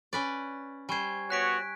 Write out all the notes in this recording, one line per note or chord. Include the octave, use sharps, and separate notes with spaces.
C#4 B4 D5
G3 C5 G#5 C#6 G#6
B3 F#4 C#5 F#6 B6 D7